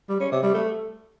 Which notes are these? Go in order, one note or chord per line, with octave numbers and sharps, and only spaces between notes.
G3
C#4
C3
G3
A3